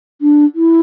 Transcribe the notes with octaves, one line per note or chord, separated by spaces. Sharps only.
D4
E4